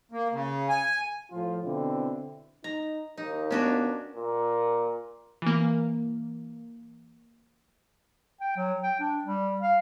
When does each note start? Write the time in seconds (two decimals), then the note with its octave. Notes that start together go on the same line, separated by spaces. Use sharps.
0.11 A#3
0.32 C#3
0.69 G#5
1.31 A2 F3 F4
1.64 B2 D3 C4 E4
2.64 D#4 A#5
3.18 D#2 D#4
3.51 B3 C#4 D4 F#4
4.15 A#2
5.42 E3 A#3
8.41 G5
8.56 F#3
8.83 G5
9.00 D4
9.24 G3
9.61 F5